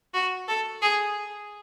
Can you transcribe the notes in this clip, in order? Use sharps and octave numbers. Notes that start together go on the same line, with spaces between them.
F#4
A4
G#4